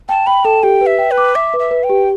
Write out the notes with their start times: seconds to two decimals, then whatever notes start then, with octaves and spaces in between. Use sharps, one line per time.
0.09 G5 A5
0.27 G5 B5
0.45 A4 A5
0.63 G4 G5
0.81 B4
0.86 E5
0.99 G5
1.11 B4
1.18 D6
1.35 E5 D6
1.54 B4
1.59 E5
1.71 B4
1.84 G5
1.90 G4